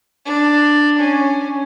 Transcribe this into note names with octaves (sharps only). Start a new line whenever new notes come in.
D4
C#4